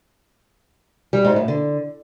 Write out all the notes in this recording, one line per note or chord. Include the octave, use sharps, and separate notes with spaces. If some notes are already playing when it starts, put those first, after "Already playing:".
G3
G#2
A2
D3